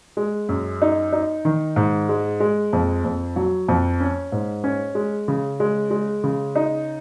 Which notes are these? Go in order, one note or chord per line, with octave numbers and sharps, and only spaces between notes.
G#3
F#2
D#4
D#4
D#3
G#2
G#3
G#3
F2
F2
F#3
F2
C#4
G#2
C#4
G#3
C#3
G#3
G#3
C#3
D#4